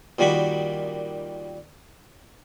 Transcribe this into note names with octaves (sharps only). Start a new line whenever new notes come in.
A#2 D#3 G3 F#4 B5 C#6